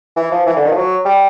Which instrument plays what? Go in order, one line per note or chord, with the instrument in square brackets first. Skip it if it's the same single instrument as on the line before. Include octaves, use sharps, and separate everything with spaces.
[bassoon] E3
F3
E3
D3
D#3
F3
F#3
G3